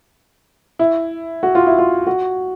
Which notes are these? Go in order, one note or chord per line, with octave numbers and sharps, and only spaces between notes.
E4
F#4
F4
E4
F4
F#4